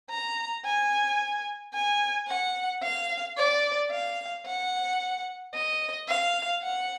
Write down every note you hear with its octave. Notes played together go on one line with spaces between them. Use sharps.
A#5
G#5
G#5
F#5
F5
D5
F5
F#5
D#5
F5
F#5